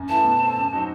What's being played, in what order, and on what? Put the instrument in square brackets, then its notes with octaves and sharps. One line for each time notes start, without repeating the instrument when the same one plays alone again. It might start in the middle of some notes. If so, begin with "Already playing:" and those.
Already playing: [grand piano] F#2
[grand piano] E3 A3 E4 [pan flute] A5
[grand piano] B2
A3 C4
F#2
F#3 C4 D#4 F#4